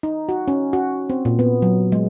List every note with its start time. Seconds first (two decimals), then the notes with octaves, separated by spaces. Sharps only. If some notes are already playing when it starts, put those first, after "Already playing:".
0.03 D#4
0.29 F#4
0.48 C#4
0.73 F#4
1.10 C4
1.25 A#2
1.39 B3
1.62 F#3
1.92 G#3